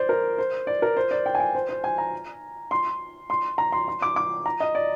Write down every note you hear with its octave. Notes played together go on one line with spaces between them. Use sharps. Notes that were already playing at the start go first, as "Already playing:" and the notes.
Already playing: C5 D5
A#4
C5
D5
A#4
C5
D5
G5
G#5
G5
C5
C5
G#5
A#5
C6
C6
A#5
C6
C6
D6
D6
A#5
D#5
D5